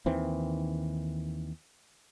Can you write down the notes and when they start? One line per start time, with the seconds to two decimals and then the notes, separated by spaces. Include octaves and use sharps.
0.06 D#2 D#3 E3 C4